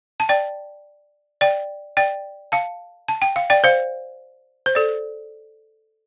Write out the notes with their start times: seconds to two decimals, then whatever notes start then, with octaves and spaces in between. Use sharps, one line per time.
0.20 A5
0.29 D5 G5
1.41 D5 G5
1.97 D5 G5
2.52 F5 A5
3.08 A5
3.22 G5
3.36 F5
3.50 D5 G5
3.64 C5 F5
4.66 C5
4.75 A4 D5